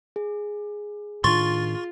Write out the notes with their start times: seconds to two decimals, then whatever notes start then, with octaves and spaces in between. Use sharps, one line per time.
0.16 G#4
1.24 A2 D#3 D4 F4 C6 C#6 A6